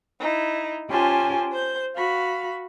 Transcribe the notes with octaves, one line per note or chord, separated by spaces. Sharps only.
D#4 E4
C#4 F4 G4 C5 G#5 A5
C5 G6
F#4 F5 B5